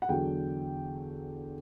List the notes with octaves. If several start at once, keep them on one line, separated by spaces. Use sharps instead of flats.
F#5
E2 D3 F#3 G5